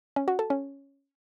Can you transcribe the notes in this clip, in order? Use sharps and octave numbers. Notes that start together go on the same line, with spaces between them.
C#4
F#4
A4
C#4